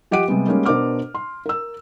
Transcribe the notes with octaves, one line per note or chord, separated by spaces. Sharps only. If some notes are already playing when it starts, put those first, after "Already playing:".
F3 G4 D#5 F#5 D7 D#7
C3 G3 G#3 B3
G3 G#3 A#3 C#4
B2 D4 A#4 C5 D6 F6
C6
A#4 E6